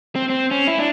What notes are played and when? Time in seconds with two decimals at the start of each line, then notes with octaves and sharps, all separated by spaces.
0.15 C4
0.30 C4
0.51 C#4
0.67 E4
0.79 D4